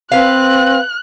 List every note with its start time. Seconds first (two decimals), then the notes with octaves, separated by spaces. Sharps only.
0.12 C4 B4 F5 F#6